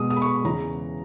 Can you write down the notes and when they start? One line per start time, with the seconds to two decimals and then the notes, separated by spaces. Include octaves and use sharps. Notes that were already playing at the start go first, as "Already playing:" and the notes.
Already playing: B2 G#3 D#6
0.10 D#6
0.16 B5
0.22 C#6
0.45 E2 C#3 E3 A#5